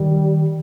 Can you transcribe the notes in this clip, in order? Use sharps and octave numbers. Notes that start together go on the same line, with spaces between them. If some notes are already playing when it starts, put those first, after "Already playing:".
Already playing: D#3 G3